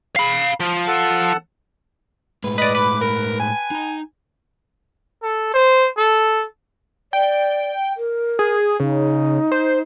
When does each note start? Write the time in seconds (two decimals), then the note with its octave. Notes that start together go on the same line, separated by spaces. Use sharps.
0.16 F5 B5
0.60 F3
0.88 A4 F#5 A5
2.44 A2 G#3 B4
2.58 B4 D5 D#5
2.75 B4 D6
3.01 A#4
3.40 G#5
3.71 D#4 A#5
5.23 A4
5.54 C5
5.98 A4
7.13 D5 G5
7.97 A#4
8.39 G#4
8.80 C#3 D#4
9.52 C5